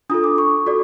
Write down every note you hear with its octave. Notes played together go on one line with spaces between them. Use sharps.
D4 F4 A4 D#6
D6
C#6
F#4 A4 D5